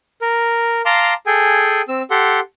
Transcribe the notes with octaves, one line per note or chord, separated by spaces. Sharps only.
A#4
F5 A5 A#5 C6 D6
G#4 A4 G5 G#5
C4 E6
G4 A4 F#5 C6